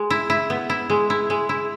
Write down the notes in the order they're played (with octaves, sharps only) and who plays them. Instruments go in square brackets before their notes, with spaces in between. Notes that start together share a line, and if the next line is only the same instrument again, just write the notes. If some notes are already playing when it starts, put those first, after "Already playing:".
Already playing: [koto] G#3
E4
E4
B3
E4
G#3
E4
G#3
E4